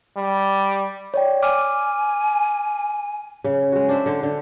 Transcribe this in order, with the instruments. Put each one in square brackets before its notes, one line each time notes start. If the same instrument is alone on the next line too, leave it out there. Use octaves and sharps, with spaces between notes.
[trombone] G3
[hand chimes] C#5 D5 G5
[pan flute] G#5 [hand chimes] D6 F6
[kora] C#3
G#3 F#4
D4 C5 E5
D3
D3